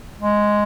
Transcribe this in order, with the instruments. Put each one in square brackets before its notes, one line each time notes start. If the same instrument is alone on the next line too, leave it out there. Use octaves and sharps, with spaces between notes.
[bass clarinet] G#3